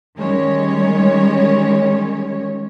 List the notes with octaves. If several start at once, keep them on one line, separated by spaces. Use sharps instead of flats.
D#3 G3 G#3 C#4 C#5